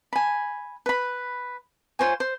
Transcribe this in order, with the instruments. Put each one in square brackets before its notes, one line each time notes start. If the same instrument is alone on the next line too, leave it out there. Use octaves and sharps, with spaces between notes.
[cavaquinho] G#5 B5
B4 B5
F4 C5 C#5 G#5
C5